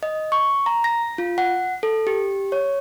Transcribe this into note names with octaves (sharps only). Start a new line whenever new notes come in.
D#5
C#6
A#5
A#6
F4
F#5
A4
G4
C#5